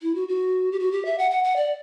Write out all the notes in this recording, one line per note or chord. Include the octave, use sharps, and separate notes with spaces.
E4
F#4
F#4
G4
F#4
G4
E5
F#5
F#5
F#5
D5